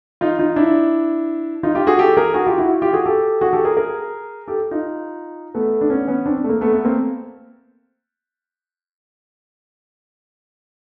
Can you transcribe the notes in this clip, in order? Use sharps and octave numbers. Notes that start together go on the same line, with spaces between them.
D#4 F4
D#4 F4
D4 E4
D#4 F4
F4 G4
F#4 G#4
G4 A4
G#4 A#4
F#4 G#4
F4 G4
E4 F#4
F4 G4
F#4 G#4
G4 A4
F#4 G#4
G4 A4
G#4 A#4
G#4 A#4
G4 A4
D#4 F4
A3 B3
D4
B3 C#4
B3 C#4
C4 D4
A3
A#3
A3 B3
A3 B3
A#3 C4